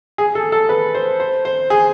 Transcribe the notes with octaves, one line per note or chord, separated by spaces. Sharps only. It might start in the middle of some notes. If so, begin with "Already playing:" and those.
G#4
A4
A4
B4
C5
C5
C5
G#4